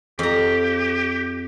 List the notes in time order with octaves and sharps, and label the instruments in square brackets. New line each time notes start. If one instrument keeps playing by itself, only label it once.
[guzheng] F2 A#5 [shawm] G4